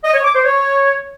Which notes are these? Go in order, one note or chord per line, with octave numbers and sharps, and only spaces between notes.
D#5
C#5
D6
C5
C#5